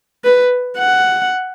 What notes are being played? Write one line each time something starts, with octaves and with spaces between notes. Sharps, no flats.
B4
F#5